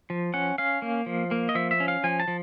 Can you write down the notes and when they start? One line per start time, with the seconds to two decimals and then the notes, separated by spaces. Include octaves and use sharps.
0.10 F3
0.34 C#4 F#5
0.58 C#4 F5
0.82 A#3
1.06 F3
1.31 A#3
1.49 D#5
1.55 F3 E5
1.71 E5
1.80 C#4
1.88 F5
2.04 F3 G#5
2.20 A5
2.28 F3